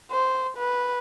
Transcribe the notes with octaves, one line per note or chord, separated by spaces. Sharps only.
C5
B4